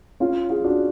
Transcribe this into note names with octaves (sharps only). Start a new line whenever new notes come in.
C#4 F4
F4 G#4
D4 F#4